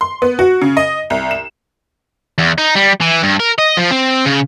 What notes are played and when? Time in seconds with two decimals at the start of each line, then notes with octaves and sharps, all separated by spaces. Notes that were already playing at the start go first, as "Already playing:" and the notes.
0.01 C6
0.22 B3
0.39 F#4
0.62 C#3
0.77 D#5
1.10 C2
1.31 E7
2.38 E2
2.58 D#4
2.75 G3
3.01 E3
3.23 G2
3.40 A#4
3.58 D#5
3.77 F3
3.91 C4
4.26 C#3